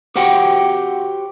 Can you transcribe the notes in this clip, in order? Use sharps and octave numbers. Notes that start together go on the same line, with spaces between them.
F#4 G4 C5 F#5 G5